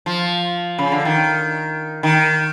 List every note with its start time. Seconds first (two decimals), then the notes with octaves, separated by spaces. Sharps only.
0.06 F3
0.78 C#3
0.92 D3
1.05 D#3
2.03 D#3